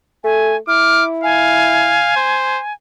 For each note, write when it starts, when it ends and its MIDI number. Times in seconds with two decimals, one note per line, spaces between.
0.24 0.57 57
0.24 0.56 80
0.68 2.02 64
0.68 1.07 86
0.68 1.04 89
1.23 2.13 77
1.23 2.73 80
2.16 2.61 72